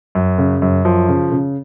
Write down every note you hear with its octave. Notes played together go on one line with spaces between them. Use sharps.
F#2
C#3
F#2
F#2 F3
C#3
C#3